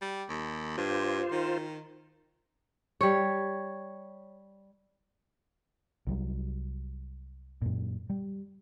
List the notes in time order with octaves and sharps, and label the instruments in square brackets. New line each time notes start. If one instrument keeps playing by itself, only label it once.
[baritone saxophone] G3
D#2
[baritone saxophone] G2 [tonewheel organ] F4 C5
[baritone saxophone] D#3
[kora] G3 C#5
[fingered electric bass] C2 F#3 G3
F#2 A#2
G3